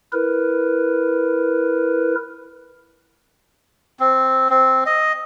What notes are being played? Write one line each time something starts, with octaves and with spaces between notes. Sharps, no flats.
E4 A#4 B4
C4
C4
D#5